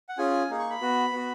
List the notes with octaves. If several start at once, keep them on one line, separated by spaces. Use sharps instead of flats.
F#5
C#4 F4 G#4 G#5
A#3 D#4 G#4
C#6
B5
B3 F#4
B3 F#4